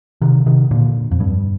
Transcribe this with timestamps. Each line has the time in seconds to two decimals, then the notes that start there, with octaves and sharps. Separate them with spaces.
0.21 C3 D#3
0.46 C3 D#3
0.71 A#2 D3
1.11 F2
1.20 G2